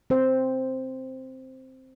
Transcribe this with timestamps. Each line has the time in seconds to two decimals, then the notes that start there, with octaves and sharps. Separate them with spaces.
0.10 C4 C5